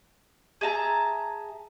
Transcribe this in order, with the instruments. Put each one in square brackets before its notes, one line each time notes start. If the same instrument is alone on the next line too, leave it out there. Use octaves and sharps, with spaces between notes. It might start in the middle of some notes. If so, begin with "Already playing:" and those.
[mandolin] G#4 E5 A5 A#5